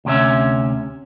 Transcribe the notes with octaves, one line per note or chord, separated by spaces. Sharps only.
D2 C3 C#4 E5